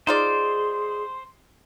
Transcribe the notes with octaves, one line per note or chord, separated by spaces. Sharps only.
D#4 F4 G#4 C5 D5